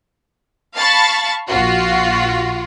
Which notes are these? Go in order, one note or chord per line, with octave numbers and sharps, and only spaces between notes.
F5 A5 B5 C#6 A6
A#1 F4 F#4